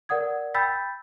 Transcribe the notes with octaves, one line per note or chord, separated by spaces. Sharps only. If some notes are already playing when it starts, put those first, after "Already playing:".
A#4 D5 F#5 D#6 G#6
G5 B5 E6 G6 A6 B6